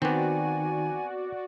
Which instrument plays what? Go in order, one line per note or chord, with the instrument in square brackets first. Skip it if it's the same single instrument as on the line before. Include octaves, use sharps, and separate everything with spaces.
[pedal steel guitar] D#3 [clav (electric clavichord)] B3 C4 [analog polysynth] F#4 D5 [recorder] G#5